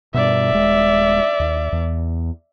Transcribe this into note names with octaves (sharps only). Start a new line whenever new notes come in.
G2 B2 D5 E5
D#1 G#3
D#2
E2